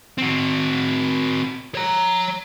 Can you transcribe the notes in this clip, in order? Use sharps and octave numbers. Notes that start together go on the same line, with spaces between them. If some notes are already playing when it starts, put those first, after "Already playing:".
C4 F#4
C#5 A#5